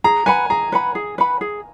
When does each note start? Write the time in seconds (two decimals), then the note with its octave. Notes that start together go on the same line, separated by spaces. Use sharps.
0.04 G#4 A#5
0.26 B4 F#5 G#5 B5
0.50 G#4 A#5
0.72 B4 F#5 B5
0.95 G#4
1.18 B4 F#5 B5
1.41 G#4